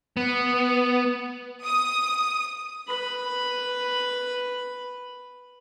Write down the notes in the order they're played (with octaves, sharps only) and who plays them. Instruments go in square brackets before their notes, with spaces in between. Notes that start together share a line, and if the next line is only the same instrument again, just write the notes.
[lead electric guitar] B3
[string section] D#6
[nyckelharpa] B4 B5